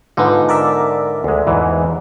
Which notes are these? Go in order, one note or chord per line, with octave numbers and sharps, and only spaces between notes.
G#2 D3 B3 D#4 F4
A#4 D5 E5
D2 G#3
E2 G#2 E3